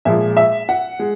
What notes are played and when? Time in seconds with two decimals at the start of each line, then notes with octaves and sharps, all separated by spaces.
0.05 A#2 F3 G#3 E5
0.37 E5
0.69 F#5
0.99 G#3